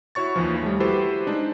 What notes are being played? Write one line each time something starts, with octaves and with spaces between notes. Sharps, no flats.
E4 F#4 C#5 C#6 A6
D#2 E3 F3
G3 A3
E4 F#4 G4 A4 B4 C5
G#3 D4 D#4